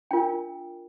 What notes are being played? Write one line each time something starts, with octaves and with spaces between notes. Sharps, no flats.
D4 F4 A#4 G5